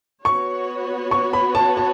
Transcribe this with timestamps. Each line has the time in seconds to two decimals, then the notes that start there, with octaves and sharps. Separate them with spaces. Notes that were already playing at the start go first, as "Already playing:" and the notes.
0.25 B3 F#4 C#5 C#6
1.11 C#6
1.33 B5
1.55 A5
1.77 A5